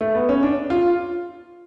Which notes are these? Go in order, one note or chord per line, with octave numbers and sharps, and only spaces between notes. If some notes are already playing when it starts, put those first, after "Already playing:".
A3
B3
C#4
D4
F4